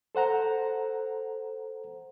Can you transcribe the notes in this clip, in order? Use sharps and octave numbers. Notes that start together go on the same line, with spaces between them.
A4 C5 F#5 A#5